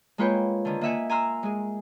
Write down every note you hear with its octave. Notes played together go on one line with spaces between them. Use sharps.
G#3 A#3 F4 B4 C#5 G5
D3 D#3
A#3 D#5 E5 F#5 G#5
G#5 A#5 C6 E6 F6
G#3 G#4